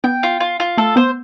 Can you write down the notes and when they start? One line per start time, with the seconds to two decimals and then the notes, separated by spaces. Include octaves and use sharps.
0.04 B3 G5
0.23 F4
0.40 F4
0.60 F4
0.78 A3 A4
0.96 B3 C5